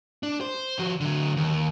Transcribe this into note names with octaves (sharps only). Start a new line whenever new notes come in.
D4
C5
F3 F#4
D3 F#3
D#2